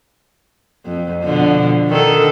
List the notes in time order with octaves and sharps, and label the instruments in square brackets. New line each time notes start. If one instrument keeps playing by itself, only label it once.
[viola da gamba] F2
B2 D3 F3
D3 D#3 A4